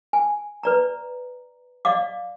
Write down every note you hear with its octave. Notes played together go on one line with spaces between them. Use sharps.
G#5
B4 D5 A#5
D5 D#5 F5 D6